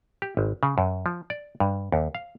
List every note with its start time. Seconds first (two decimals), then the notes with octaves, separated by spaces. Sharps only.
0.22 G4
0.37 G#1
0.63 C#3
0.78 F#2
1.06 F3
1.30 D5
1.60 G2
1.92 D#2
2.15 F5